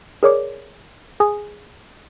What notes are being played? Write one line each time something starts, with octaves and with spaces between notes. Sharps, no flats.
G#4 A#4 C#5 D5 D6
G#4 G#5 D#6